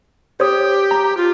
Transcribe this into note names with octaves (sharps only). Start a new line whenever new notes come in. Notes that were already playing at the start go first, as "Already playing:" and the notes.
G4 C5 C#5 D#6
A#5
F4